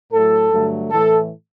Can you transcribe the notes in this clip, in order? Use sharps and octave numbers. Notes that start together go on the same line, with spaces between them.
A2 F#3 A3 A4
G2 D3 F#3 A3
A2 E3 A3 A4